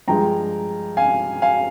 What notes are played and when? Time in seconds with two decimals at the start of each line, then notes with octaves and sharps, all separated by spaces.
0.08 G2 F3 G#3 G5 A#5
0.97 F5 G#5
1.42 F5 G#5